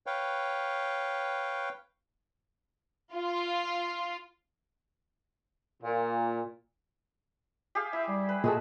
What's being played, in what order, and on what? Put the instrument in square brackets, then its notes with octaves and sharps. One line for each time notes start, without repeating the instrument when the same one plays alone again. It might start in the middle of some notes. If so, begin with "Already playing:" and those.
[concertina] B4 C#5 F5 G5
[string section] F4
[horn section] A#2
[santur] G4 G#4 F5
[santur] E4 [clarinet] E5
[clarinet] G3
[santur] B4
[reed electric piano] A#2 A4 [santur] G#3 F#4 E6 [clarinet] G#4